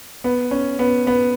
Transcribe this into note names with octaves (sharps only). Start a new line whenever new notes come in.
B3
C#4
B3
B3